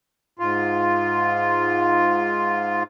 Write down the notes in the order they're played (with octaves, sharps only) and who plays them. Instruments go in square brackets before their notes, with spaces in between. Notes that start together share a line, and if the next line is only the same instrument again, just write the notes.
[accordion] G#2 F4